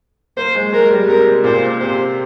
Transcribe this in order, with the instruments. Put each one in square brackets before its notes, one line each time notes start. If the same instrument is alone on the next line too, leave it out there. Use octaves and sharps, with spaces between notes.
[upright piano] A#3 [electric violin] C5
[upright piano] G#3
[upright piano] G#3 [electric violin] A#4
[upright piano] G3
[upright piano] C3 [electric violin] A#4
[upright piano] A#2 [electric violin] C5
[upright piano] C3 [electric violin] C5